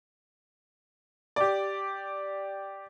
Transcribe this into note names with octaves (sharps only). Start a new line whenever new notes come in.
G4 D5